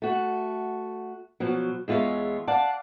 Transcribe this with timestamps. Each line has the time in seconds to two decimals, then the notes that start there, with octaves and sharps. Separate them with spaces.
0.02 A3 F#4
1.40 B2 F3 F#3
1.88 E2 G#3 F4 C#5 E5
2.47 D5 F5 F#5 A5